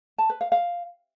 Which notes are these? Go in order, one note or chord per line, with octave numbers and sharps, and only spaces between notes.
A5
B4
F5
F5